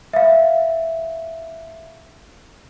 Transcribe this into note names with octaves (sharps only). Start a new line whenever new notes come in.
E5 F5